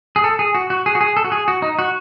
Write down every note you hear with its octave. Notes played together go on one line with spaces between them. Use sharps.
G#4
A4
G#4
F#4
F#4
G#4
F#4
G#4
A4
F#4
G#4
F#4
D#4
F#4